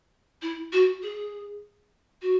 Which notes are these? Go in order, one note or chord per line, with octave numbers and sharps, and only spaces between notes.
E4
F#4
G#4
F#4